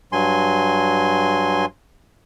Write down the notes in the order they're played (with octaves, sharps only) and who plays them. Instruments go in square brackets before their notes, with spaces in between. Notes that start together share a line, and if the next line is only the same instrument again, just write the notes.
[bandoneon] G2 F#3 G#5 C6